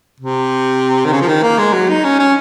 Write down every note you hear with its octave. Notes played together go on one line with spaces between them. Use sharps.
C3
D#3
C#3
F3
D#3
A#3
G#3
F#3
D#4
C#4
C#4